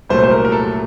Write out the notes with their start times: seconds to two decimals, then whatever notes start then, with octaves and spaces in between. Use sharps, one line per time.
0.09 C2 A#2 F#3 A3 C5
0.24 C5
0.31 A#4
0.45 A#4
0.52 A4